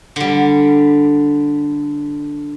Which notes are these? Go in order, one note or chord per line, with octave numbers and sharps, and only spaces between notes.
D3 G3